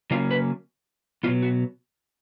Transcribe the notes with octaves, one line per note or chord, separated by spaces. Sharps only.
C#3 F#3 A#3 C#4 F4
B4
B2 F#3 B3 F4
F#4